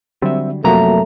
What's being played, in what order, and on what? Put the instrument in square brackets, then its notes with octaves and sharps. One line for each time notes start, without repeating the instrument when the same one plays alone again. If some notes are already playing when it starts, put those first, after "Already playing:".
[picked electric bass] D3 F#3 G3 [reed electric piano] C4 E5
[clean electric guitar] F#2 A#5 [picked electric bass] C3 F3 F#3 [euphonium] A3 [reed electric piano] A#3 F#4